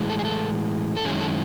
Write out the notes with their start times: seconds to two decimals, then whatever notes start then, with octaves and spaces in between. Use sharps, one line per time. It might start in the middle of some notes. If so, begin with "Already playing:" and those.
Already playing: A2 E3 G#3
0.10 A4
0.19 G#4
0.25 A4
0.97 A4
1.05 F#2 D#3 G#3 C#4 E4 G#4
1.21 A4